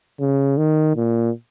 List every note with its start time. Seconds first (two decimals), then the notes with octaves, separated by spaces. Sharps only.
0.20 C#3
0.57 D#3
0.96 A#2